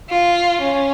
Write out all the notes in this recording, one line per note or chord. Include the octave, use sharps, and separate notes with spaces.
F4
C#4